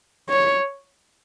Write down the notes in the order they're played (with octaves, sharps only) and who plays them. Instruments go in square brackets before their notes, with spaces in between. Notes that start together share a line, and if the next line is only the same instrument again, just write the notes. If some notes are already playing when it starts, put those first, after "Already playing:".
[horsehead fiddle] C#5